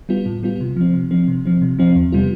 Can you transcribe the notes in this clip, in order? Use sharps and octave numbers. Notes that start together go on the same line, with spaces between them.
G3 B3 F4
A2
G3 B3 F4
C3
F3 C4
C3
F3 C4
C3
F3 C4
C3
F3 C4
E2
C3 G3 B3 F4